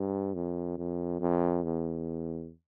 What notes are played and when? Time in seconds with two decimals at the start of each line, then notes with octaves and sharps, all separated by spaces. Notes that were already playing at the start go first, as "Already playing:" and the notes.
Already playing: G2
0.34 F2
0.78 F2
1.20 F2
1.64 E2